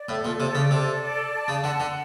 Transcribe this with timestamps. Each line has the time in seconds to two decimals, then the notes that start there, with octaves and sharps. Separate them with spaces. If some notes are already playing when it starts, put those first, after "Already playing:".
Already playing: D5
0.09 A2 A4
0.25 A#2
0.39 C3 D5
0.55 C#3
0.71 C3 A4
1.02 D5
1.33 A5
1.48 C#3
1.64 D3 F#5
1.80 D3